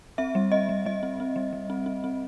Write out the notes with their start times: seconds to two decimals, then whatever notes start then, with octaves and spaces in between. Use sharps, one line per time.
0.18 C4 E5
0.35 G3
0.52 C4 D#5
0.69 G3
0.85 G3 D#5
1.03 C4
1.20 C4
1.36 G3
1.53 G3
1.70 C4
1.86 C4
2.04 C4